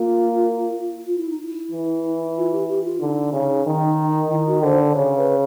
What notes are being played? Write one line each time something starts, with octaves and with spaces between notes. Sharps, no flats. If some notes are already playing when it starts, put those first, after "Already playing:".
Already playing: A#3 F4
F4
E4
D#4
E4
E3
F4
G4
G4
F4
D3 D#4
C#3
D#3
D#3 E4
F#4
D3 C5
D5
C#3 C#5
B4